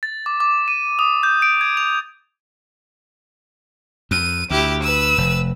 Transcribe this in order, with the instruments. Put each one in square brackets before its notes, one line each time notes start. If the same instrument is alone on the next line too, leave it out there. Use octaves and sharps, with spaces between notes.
[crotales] A6
D6
D6
D#7
D#6
G6
D7
G#6
F7
[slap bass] F2 [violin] D#7
[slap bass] D2 [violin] E4 G4
[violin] B4 E6
[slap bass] F1